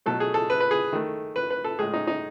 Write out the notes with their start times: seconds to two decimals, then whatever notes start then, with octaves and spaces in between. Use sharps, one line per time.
0.06 B2 F#3 A3 A4
0.20 G#4
0.34 A4
0.50 B4
0.60 B4
0.71 G#4
0.93 D#3 A3
1.36 B4
1.50 B4
1.64 A4
1.79 A2 G#3 G#4
1.94 D#4
2.07 D#4